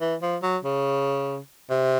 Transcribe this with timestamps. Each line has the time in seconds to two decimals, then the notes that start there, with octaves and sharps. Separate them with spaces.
0.01 E3
0.22 F3
0.43 F#3
0.64 C#3
1.70 C3